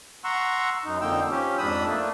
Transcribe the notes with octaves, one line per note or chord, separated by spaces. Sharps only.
F#5 A#5 C6 C#6 E6
F#2 D#4
F2 D3 A#3 D#4 G5 E6
F3 C#4 G4
F2 G#2 D4 B5 D#6 E6
A3 A#3 D4